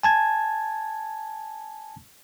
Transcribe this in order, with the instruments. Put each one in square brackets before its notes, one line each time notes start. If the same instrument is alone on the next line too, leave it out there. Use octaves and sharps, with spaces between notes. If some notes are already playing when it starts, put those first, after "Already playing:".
[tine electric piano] G#5 A5 G#6